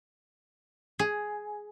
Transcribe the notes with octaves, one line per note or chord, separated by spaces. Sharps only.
G#4